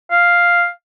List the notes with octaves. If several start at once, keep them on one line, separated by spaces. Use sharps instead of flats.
F5